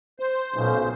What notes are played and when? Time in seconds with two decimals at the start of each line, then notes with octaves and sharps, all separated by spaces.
0.20 C5
0.54 B1 A#2 C#3